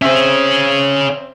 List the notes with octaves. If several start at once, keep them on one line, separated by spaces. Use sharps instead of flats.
C4 C#4 G#4 E5